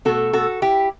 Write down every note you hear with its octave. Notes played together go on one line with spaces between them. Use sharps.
B2 A3 F#4 A4
F#4 A4
E4 G4